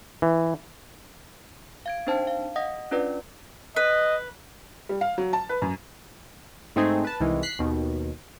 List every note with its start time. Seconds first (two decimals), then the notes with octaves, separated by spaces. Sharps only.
0.22 E3
1.86 F5 G#6 D7
2.07 C4 D4 D#4 C5 G5 A5
2.27 F5
2.56 D#5 F#5 D#6 A#6
2.91 C#4 D4 F4 B4 D5
3.76 B4 D#5
4.89 G3
5.01 F5
5.18 F#3
5.33 A5
5.49 B4
5.62 F#2
6.76 G#2 A3 C4 D#4 G#4
7.05 B4 A5
7.20 C2 D#3 E3 G#3
7.43 F#6 B6 C7
7.59 D#2 B2 D#3